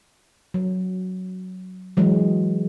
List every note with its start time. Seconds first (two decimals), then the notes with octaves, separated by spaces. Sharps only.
0.54 F#3
1.97 E3 F#3 G#3